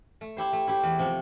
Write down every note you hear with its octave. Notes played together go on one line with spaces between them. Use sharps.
A3
E4 G4 C5
A3
E4 G4 C5
E2
C3 F3